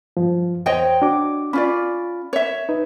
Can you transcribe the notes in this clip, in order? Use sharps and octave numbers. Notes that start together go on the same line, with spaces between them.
G2 F3
E2 C5 C#5 D#5 G5
D4 F#4 D6
C#4 F4 D5 B5
C#5 E5
D#4 B4